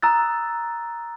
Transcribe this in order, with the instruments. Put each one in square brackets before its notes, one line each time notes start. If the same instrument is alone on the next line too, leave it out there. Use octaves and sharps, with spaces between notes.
[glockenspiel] A#5 D#6 E6 F#6 A6